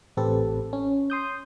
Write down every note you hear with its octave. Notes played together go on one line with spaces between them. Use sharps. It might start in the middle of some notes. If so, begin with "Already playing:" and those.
A1 C4 G4 A4 B4
C#4
C6 D#6 G6